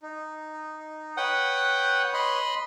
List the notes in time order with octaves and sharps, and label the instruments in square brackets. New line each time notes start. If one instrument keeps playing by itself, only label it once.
[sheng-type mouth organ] D#4
[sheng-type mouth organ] B4 C#5 D#6 [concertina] F#5 G5
[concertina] D#5 B5 C6